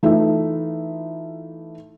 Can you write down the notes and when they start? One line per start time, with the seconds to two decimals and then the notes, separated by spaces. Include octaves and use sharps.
0.03 E3 A3 D#4 F4 A4 E5